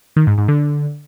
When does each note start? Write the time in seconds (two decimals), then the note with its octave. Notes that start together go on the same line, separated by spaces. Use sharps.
0.16 D#3
0.27 G#2
0.38 G#2
0.48 D3